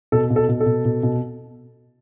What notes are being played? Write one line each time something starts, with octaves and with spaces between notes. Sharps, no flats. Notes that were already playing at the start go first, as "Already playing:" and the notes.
B2 A4
B2
A4
B2
A4
B2
B2
B2